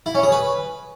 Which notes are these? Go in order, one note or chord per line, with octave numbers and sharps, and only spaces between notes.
E4
C#4
G#4
B4